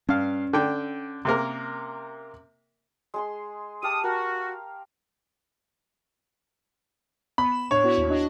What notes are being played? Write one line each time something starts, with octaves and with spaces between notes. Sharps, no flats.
G2 C#4 F5
D3 G5
C3 A#3 A#4
G#3 G#4 C6
G4 F5 A5 D#6
F#4 A#4
B3 B5
E7
A2 D4 C#5
B3 E4 F#4
D#2
D4 F#4 D#5